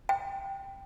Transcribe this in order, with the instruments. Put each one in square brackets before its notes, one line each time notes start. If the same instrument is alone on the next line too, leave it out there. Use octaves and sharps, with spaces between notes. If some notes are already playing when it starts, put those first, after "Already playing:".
[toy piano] G5